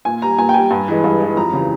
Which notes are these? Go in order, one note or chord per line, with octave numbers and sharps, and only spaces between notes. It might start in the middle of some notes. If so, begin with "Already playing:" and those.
A#2 G#5
G3 A#5
A#2 G#5
G5
G3 G#5
G2
E3 G#3
G2
E3 G#3
F2 A#5
C#3 E3 G3